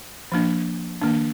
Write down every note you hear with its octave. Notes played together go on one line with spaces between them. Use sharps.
F3 A#3 D4
D#3 A#3 D4